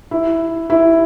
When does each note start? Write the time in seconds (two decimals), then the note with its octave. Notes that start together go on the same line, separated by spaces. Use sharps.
0.11 E4
0.70 E4